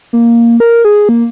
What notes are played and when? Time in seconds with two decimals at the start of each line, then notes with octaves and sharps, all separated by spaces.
0.13 A#3
0.60 A#4
0.85 G#4
1.09 A#3